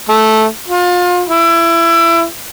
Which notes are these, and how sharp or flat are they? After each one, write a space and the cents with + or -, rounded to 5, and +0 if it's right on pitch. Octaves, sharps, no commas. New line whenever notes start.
A3 -10
F4 +30
E4 +25